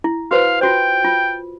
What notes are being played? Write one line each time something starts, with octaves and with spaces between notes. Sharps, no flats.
E4
F#4 B4 C5 F5
F4 F#4 C5 G5
F4